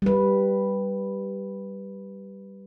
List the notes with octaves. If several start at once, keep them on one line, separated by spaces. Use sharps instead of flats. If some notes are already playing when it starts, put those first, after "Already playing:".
G3 B4